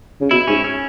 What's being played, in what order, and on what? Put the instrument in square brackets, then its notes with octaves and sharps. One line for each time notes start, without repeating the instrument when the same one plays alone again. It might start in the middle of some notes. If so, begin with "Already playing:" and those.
[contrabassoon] C#3
[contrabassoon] B2 [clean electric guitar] E4
[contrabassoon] G#2 [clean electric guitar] C#4
[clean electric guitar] C#4